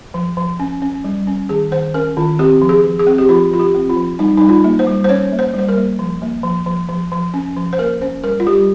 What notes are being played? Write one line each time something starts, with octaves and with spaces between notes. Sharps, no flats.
F3
F3
C#4
C#4
G3
C#4
D#3 G#4
D#3 C5
C#4 A#4
D#3 F4
C4 G4
F3
G#4
F3
G#4
C4
G4
F3 F4
F3 F4
G4
C4
F4
F3
G3 D#4
G3 D#4
F4
A#3
C5
G3
C5
C#4 C#5
A#3
C5
G3 C5
A#4
A#3
F3
A#3
F3
F3
F3
F3
C#4
F3
C5
A#3 A#4
C#4 C5
G3 A#4
F4
G3 G4